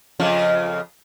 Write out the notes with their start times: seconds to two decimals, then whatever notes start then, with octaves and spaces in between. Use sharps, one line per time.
0.20 F2 C#3 F4